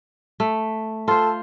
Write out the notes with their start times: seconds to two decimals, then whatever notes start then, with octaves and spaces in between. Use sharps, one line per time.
0.40 A3
1.08 F4 A4 C5